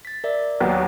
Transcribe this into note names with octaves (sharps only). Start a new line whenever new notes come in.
A6 B6
A#4 D5 E5
D#2 F#3 B3